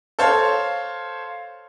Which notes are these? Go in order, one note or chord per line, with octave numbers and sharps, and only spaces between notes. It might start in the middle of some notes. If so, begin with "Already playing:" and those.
A4 C5 C#5 F5